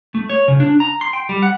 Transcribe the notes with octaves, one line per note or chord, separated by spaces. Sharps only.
A3
C#5
C#3
D4
A#5
C6
G5
G3
F#5